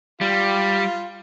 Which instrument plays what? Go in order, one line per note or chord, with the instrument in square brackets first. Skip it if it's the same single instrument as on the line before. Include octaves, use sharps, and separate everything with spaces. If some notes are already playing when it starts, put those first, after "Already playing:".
[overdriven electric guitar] G3 [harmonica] F4